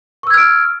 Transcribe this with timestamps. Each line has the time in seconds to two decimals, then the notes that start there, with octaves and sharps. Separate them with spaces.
0.23 C#6
0.27 E6
0.30 G#6
0.34 F6
0.37 D7